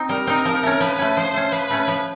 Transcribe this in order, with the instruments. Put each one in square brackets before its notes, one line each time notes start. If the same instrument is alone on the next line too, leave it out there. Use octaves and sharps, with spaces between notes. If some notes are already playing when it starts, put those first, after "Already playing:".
Already playing: [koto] C4 D#4
[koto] G3 [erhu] A#4
[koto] C4 D#4
F3
A3 C#4
[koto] F3 [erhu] B4
[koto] A3 C#4
[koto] F3 [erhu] C5
[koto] A3 C#4
[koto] F3 [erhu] B4
[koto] A3 C#4
F3